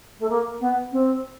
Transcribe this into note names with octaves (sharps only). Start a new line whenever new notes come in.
A3
A#3
B3
C4